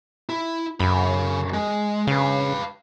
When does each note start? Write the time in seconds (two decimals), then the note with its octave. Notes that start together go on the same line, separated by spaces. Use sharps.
0.29 E4
0.80 F#2 C#3 B5
1.54 G#3
2.07 C#3 B4 F5